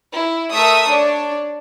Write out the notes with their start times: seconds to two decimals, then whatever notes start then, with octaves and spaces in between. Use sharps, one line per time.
0.12 E4
0.52 A3 A#4 E5 D#6
0.90 D4 C#5